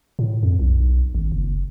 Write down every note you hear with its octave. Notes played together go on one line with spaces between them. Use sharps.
A2
F2
B1
G#1
F#1